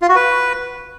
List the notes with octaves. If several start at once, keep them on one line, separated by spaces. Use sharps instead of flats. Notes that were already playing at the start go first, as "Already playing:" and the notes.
F4
F#4
B4